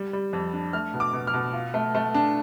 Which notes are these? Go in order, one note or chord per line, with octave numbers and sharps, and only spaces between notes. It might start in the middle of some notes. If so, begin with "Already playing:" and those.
Already playing: G3
G3
F2
D4
A3 F6
B2
D6
B2
F6
B2
F4
A3
A3
D4